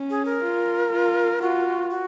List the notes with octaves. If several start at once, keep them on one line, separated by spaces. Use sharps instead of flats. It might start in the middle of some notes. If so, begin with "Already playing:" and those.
Already playing: C#4
G#4
A#4
F4
F4
F4 F#4
F#4